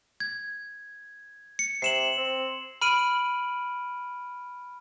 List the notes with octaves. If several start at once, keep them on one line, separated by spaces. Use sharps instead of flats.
G#6
C#7
C3 C7 E7 F#7
C4
B5 F6 D7 D#7 F#7